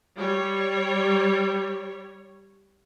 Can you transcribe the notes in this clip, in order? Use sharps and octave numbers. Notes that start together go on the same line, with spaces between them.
G3 C#5